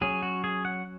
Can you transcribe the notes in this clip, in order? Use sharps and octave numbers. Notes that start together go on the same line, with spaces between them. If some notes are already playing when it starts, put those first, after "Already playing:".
F#3 C#4 G#4
F#4
G#4
F#5